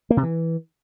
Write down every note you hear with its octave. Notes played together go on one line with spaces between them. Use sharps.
A#3
C3
E3